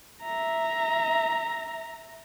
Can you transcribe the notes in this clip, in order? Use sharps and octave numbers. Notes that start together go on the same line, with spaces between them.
E5 A#5